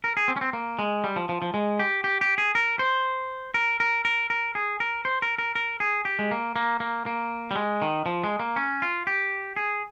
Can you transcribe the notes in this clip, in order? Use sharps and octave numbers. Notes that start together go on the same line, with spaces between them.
A#4
G#4
C4
C#4
C4
A#3
G#3
G3
F3
F3
F3
G#3
G4
G4
G4
G#4
A#4
C5
A#4
A#4
A#4
A#4
G#4
A#4
C5
A#4
A#4
A#4
G#4
G4
G#3
A#3
A#3
A#3
A#3
G3
G#3
D#3
F3
G#3
A#3
C#4
F4
G4
G#4